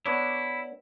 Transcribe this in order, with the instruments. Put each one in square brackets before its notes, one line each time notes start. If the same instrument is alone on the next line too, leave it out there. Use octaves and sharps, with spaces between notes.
[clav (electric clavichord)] B3 D4 C#5 [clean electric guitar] E4